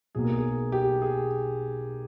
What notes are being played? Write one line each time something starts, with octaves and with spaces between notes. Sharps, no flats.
B1 B2 A#3 G#4
A#4
G#4
G4
G#4